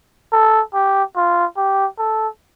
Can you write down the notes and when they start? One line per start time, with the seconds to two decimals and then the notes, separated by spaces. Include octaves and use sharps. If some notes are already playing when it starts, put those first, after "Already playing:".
0.32 A4
0.74 G4
1.16 F4
1.57 G4
1.98 A4